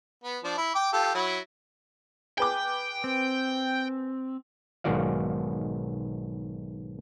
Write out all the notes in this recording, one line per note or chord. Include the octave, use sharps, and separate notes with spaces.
B3
F3 D4
E4
G5 D6
F4 G4 A4
F#3 E4
G#4 B4 G5 D6
C4
B1 G#2 D#3 F#4 D5 F5